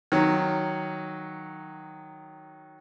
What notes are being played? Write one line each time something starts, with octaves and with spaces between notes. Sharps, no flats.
D#3 F#3